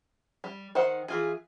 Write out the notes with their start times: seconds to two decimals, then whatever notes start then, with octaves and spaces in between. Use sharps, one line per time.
0.44 G3
0.75 D#3 C5 F#5
1.08 E3 F4 G#4